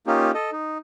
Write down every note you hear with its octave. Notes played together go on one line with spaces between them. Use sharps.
A#3 C#4 D#4 F4 G4
A4 D#5
D#4